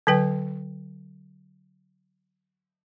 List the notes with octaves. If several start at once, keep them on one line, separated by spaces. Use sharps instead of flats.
D3 F#3 B4 G5